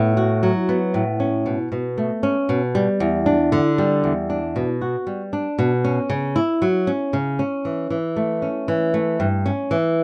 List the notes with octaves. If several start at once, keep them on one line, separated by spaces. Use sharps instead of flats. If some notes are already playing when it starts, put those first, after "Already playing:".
Already playing: A2 B3
F#4
F#3
B3
A2
C#4
B2
B2
A3
C#4
B2
G3
E2
D4
D3
G3
E2
D4
B2
F#4
G3
D4
B2
C#4
C#3
E4
F#3
C#4
C#3
C#4
E3
E3
A3
C#4
E3
A3
G2
C#4
E3